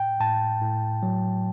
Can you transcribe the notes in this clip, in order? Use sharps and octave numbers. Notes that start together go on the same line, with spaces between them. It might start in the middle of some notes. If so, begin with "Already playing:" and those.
Already playing: A2 G5
A2 A5
A2
F#3